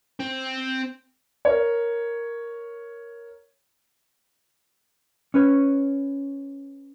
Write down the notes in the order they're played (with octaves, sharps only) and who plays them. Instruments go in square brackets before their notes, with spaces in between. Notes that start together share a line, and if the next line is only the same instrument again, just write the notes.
[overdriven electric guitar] C4
[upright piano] A#4 C#5
[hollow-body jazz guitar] C#4 B4 C#5